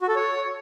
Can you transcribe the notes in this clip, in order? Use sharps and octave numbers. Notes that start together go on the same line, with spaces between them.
F#4
A4
C#5